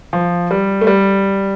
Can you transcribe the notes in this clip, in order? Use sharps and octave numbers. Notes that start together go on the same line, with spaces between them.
F3
G3
A3
G3